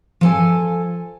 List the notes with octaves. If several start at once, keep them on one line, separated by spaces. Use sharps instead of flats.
F3 A4 G#5